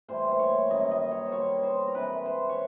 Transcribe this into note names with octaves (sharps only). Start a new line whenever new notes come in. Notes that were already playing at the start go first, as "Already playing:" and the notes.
A2 E3 G3 A#3 C5
C5
C#5
F#2 D#3 G3 A#3 D#5
D#5
C#5
C5
B2 G3 A#3 C#5
C5
A#4
C3 E3 G#3 B4
C5
C#5